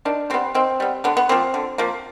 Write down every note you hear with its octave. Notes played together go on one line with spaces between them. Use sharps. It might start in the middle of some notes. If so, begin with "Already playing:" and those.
D#3 D4
G3 B3 C4
D#3 C4
G3 B3
D3 B3
B3
F3 A#3 C4
D3
F3 A#3